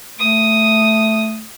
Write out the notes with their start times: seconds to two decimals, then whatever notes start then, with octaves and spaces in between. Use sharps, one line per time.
0.19 A3 D#6